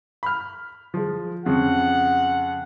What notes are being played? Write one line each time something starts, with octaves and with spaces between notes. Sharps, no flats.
B5 F6
F3 G#3
F2 C#3 F#5